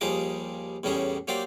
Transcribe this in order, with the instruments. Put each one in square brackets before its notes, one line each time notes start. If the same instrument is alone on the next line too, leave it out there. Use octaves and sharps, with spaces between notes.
[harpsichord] D#2 F3 G3 G#4 D#5 D6
E2 A2 G3 C#4 G#4
F#3 A#3 G4 C5 D5